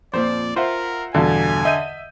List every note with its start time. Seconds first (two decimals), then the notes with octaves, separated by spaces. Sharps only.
0.14 F2 A#2 F3 C5 D5
0.56 F4 A#4 C5 E5 F#5
1.15 E2 G2 B2 D3 G#5
1.65 D#5 E5 G6 D#7